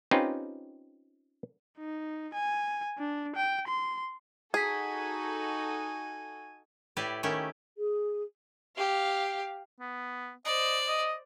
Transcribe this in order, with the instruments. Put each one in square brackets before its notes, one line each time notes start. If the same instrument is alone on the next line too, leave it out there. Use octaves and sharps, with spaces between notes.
[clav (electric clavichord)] C4 C#4 D#4 F4 G4 B4
[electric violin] D#4
G#5
D4
G5
C6
[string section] D#4 F#4 A4 [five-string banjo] G#4 [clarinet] G#5 [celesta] G#6 B6
[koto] A2 E4 G4 B4 D5
D#3 A3 C#4 E4 G4
[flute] G#4
[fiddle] G4 F5
[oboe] B3
[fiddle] C5 D5 [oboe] D#5
[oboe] D#5